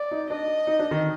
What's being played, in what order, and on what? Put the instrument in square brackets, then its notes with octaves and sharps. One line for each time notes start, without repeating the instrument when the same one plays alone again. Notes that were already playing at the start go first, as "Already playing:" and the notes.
Already playing: [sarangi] D5
[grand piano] D#4
[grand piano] D4 [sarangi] D#5
[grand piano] D#4
D4
D#3